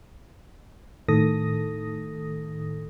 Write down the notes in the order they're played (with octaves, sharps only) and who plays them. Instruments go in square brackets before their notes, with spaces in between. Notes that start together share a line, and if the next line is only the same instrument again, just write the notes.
[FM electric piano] A2 D#3 A4 D#6 A#6